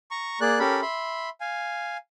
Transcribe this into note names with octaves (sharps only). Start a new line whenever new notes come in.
A#5 C#6
A#3 G#4 D5 F#6
C#4 G4 A4 A#4 B5
E5 B5 C6
F5 G#5